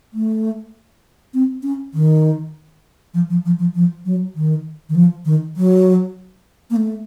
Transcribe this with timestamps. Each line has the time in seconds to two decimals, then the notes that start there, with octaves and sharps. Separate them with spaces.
0.13 A3
1.34 C4
1.63 C#4
1.94 D#3
3.14 F3
3.30 F3
3.45 F3
3.59 F3
3.75 F3
4.05 F#3
4.36 D#3
4.89 D#3
4.95 F3
5.25 D#3
5.57 F#3
6.70 A#3
6.76 A3